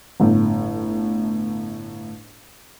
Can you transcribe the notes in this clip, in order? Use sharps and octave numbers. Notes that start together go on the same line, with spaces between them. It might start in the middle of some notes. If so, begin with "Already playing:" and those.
G1 A2